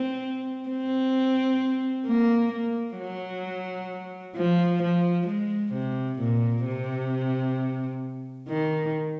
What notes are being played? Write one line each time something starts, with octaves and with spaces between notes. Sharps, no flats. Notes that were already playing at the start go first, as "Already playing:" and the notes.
Already playing: C4
C4
A#3
A#3
F#3
F3
F3
G#3
C3
A#2
C3
D#3